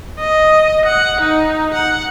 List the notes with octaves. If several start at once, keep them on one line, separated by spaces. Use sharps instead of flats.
D#5
F#5
D#4
F#5